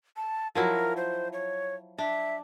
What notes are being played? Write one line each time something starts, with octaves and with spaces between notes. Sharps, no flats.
A5
F3 F#3 E4 A#4
C5
C#5
D4 E5